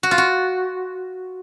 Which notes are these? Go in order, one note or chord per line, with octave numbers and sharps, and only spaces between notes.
F#4
F4
F#4